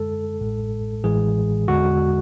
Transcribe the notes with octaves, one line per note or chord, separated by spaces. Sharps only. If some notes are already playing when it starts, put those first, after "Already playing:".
Already playing: F#2 D3 G#3 A4
A1 A2 G#3
A1 A2 E3 G#3 G#4
E2 D3 G#3 F#4